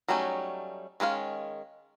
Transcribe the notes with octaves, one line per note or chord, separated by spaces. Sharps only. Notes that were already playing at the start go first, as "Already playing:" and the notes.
F#3 G3 A3 C#4 D#4
D#3 G#3 C#4 F5